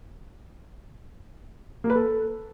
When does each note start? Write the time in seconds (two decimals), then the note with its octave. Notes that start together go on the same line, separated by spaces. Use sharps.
1.84 A#3
1.90 B4
1.96 A4